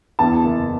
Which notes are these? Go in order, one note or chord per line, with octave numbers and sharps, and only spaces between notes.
E2 A5
F#1